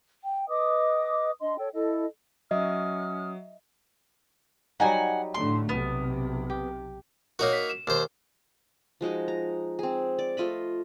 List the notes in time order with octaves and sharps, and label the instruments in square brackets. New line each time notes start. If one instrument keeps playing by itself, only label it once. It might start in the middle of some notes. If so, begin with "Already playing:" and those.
[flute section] G5
B4 D#5 D6 D#6
D4 D#5 C6
A4 C#5 G5
E4 A4 D#5
[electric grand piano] F#3 [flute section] C#4 D#6 F6 [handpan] D#5 E5
[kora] F#3 G3 D#4 [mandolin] F#5 G#5
[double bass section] A2 D3 A3 [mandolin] C6
[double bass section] B1 C3 [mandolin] B3
[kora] G4
[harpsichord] A#3 D#4 F#4 [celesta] A#4 C#5
[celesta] B6
E7
[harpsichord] D#2 C5
[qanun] F3 G#3 D#4 F#4
A#5
C4 G#4
D5
A3 F4 D#5 B5